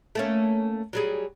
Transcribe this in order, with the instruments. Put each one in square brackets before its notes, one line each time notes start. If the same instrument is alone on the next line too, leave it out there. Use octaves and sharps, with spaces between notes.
[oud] A3 A#3 C#4
F#3 G3 G#4